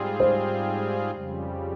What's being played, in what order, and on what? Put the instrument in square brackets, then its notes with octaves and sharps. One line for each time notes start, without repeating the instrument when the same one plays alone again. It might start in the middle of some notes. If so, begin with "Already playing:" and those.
Already playing: [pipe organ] G#2 G3 C4 F4 G#4
[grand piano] C5
[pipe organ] F2 C#3 G3